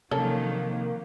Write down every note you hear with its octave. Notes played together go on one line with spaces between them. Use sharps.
C3 D#3 F3 F#3 A#3 C#4 A4 A#4